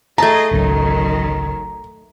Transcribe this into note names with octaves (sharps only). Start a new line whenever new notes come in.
A3 G#4 D#5 A5 A#5
G#1 C#2 D#3 F#3